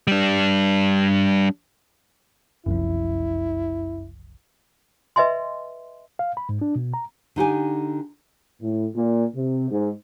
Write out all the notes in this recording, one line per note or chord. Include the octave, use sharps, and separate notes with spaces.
G3 D4
F#1 C2 F#2 F3 E4
B4 D#5 E5 G#5 C6
F5
B5
G#2
D4
B2
A#5
D3 D#4 G4 G#5
A2
A#2
C3
G#2